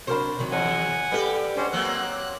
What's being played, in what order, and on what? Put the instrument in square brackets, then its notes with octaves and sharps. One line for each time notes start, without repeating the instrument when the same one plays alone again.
[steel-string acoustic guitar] C3 F#3 D4 [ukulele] F#4 A#4 B5 [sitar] C5
[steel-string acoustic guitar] C3 D#3 F#3
[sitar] E2 [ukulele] C#5 [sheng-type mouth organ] F#5 G#5
[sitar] G3 G4 [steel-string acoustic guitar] A4 B4
[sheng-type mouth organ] C#4 D4 C5 [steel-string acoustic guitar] G#4 D#5 F#5
[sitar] F#3 A#3 C4 [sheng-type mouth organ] F#6